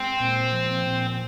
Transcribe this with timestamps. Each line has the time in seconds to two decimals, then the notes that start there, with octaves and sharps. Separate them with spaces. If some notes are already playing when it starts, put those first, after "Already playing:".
Already playing: G#3 C4
0.19 A#2
0.52 F3
0.85 A#2